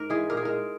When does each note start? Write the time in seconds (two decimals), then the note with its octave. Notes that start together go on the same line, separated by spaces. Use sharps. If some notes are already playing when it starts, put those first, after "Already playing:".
Already playing: G#2 A#4
0.10 E3 G#3 G#4
0.30 A#2 A#4
0.37 G#4
0.45 G#3 A#4